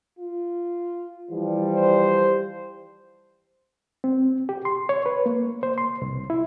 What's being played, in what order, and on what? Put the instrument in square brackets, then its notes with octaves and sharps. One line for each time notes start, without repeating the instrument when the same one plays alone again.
[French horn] F4
[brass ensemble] E3 F3 G3
[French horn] C5
[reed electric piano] C4
G4
C6
C#5
B4
A#3
C5
C6
C2
E4